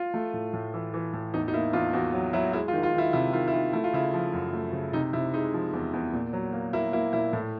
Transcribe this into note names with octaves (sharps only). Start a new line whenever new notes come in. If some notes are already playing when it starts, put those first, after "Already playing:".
Already playing: F4
A3
A2
A2
E3
E3
A2
E2 D#4
D#4
A#3 E4
E2 F4
E2 F#4
F#3
F#3 E4
G#3 E4
F4
D#3
F4
D#3 E4
C3 E4
D#3 F4
E4
D#3 F4
A3 E4
F4
C#3 E4
F3
F#2
A3
C#3
C3 D#4
C3 E4
G#3 D#4
F3
E2
E2
A#2
F#3
A#3
A#3 E4
A#3 E4
A#2 E4
A2